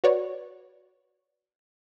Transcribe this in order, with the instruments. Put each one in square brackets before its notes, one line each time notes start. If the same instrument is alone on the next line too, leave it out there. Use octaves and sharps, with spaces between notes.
[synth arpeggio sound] F#4 B4 C#5 D5